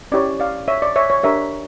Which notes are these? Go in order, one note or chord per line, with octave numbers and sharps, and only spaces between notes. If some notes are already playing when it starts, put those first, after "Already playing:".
C#4 E4 G4 C#5 D5
D5 F5
C#5 E5
D5
C#5 E5
C#5
D4 G4 A#4 C#5 E5